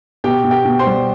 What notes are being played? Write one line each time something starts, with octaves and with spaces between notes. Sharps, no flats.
B2 G4 G5
B2
G4 G5
B2
C5 C6
G3